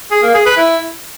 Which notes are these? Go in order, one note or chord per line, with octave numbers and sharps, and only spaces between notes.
G#4
A#3
G#4
B4
E4